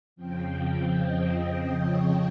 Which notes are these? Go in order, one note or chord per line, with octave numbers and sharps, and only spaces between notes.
F2 C#3 F3 C4 G5
D#5
C#5